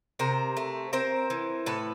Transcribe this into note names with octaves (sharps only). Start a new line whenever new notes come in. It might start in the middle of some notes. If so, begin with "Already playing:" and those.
C3 A#4 C5
A3
C4 A#4 C5
E3
A2 A4 B4